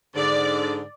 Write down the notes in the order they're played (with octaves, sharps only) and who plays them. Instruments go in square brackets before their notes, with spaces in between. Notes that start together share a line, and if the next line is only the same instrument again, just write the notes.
[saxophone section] G#2 D3 [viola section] D5